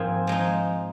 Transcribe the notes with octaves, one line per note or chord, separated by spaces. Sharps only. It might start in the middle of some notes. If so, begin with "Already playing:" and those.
Already playing: G#2 F3 A#3 C4 F4 G#4
F3 G#3 D#4